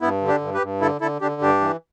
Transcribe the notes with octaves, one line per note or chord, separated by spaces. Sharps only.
G2 B3 E4
D3
D4 G4
G2
G4 B4
G2
D3 E4 A4
D3 E4 A4
D3 D4 G4
G2 D4 G4
E3